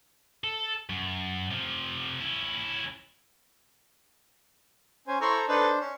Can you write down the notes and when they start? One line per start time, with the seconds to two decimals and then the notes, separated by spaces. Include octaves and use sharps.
0.44 A4
0.90 F#2
1.51 C3 F3
2.20 C#4 E4
5.08 C#4 C5 G#5
5.21 E4 A4 C5 A#5 C6 C#6
5.48 D4 D#4 A4 B4 C5
5.80 C#4